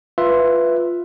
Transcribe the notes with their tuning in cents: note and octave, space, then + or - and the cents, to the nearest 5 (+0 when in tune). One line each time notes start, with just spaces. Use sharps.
F4 +0 B4 +0 E5 +5